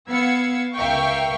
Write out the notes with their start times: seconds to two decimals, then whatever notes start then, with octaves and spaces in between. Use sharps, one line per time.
0.10 B3 F5 E6 G#6 C#7
0.75 C#2 A#4 E5 F5 G5 C#6